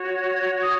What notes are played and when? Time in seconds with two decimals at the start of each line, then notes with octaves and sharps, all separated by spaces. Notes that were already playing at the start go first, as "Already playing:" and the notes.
Already playing: F#4 C#5
0.60 D#6